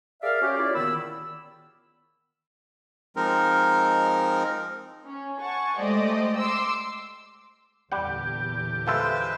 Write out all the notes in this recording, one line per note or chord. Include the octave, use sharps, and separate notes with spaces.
G#4 A#4 D5 E5 F5
C#4 F#4 G4
C#4 E4 F4 G#4 D5
A#2 D#3 B3 B5 E6
F3 G#3 C4 D#4 A#4
C#4
F#5 G#5 A5 C#6
G#3 A3 G4 C5 D5 D#5
C6 D6 E6
E2 A#2 D3 G3 G4 F#5
G#3 F4 A4 B4 C5 E5